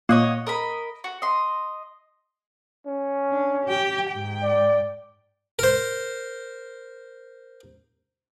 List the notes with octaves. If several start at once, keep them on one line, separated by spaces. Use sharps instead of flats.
A#2 C#5 D#5 F#5
A#4 D#5 B5
F#4
D#5 C6
C#4
D4
G4 G5
G#2 G5
D5
A#4 C5